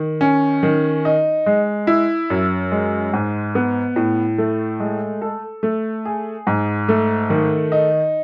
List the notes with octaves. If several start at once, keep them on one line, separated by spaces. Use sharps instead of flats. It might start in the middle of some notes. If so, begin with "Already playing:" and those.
Already playing: D#3
C#4
D#3
D#4
G#3
E4
F#2
G#3
G#2
B3
A2
A3
G#3
A4
A3
G#4
G#2
A3
D#3
D#4